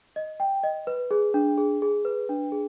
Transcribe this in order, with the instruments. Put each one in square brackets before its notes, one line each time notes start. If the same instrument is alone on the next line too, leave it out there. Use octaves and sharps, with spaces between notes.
[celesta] D#5
G5
D#5
B4
G#4
D4
G#4
G#4
B4
D4
G#4